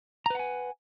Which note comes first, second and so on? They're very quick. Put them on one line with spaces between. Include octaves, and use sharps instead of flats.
A#5 B4 F#5 G#5